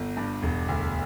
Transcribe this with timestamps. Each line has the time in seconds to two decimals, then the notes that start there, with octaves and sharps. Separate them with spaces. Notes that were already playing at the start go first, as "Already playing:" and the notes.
Already playing: G1
0.17 G2
0.42 E1
0.68 D2